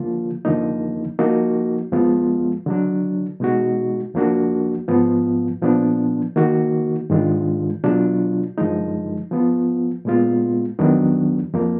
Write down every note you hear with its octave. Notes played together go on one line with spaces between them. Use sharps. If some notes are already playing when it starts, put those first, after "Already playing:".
Already playing: D3 F3 A#3 F4
F2 D3 F3 A#3 D#4
F3 A#3 D#4 F#4
F2 F3 G#3 B3 F4
D3 F#3 D4
B2 G#3 D#4 F#4
F2 F3 A#3 D4 F#4
G#2 F3 B3 F4
A#2 F3 B3 D4
D#3 A#3 D#4 F#4
G#2 D#3 G#3 D4 F4
B2 F#3 D4 F4
F#2 D3 F3 G#3 D#4
F3 B3 F4
A#2 G#3 B3 F4
F2 D#3 F#3 B3 D4
F2 F3 A#3